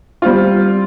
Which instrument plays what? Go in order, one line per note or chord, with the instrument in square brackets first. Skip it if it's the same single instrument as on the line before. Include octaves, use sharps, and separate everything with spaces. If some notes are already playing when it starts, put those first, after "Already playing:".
[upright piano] G3 C4 F4